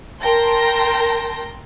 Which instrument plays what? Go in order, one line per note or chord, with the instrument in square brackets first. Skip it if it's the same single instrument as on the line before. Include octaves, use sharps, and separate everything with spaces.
[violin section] A#4 G5 A5 C6 A#6